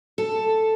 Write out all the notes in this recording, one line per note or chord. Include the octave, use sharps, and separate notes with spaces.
A4